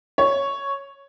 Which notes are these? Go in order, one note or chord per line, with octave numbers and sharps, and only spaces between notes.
C#5